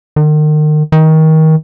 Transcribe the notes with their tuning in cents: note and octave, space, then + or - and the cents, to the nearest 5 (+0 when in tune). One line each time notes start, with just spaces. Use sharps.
D#3 -35
D#3 +25